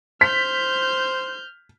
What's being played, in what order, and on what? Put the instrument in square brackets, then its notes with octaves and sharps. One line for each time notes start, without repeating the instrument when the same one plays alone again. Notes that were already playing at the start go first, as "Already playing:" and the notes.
[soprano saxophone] C5 [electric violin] F6 G6 [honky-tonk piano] B6